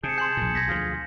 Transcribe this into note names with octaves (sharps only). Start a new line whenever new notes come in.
C3 G#4 A5 G6 C#7
G#5 C6 G6 C#7 F#7
A#1 A#2
B1 G#6 A#6 B6
D2 F3 F4 G#4